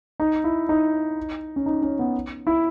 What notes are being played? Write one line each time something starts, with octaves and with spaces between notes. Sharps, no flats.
D#4
E4
D#4
C#4
D#4
C#4
B3
E4